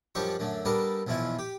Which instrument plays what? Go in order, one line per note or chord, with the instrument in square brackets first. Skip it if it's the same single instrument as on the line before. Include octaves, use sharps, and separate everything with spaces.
[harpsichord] F#2 F3 G3 D4 G4 C#6
F#2 D3 A3
G3 B3 D4 A4 A#4
B1 F2 B2 E3 E4 F4
G4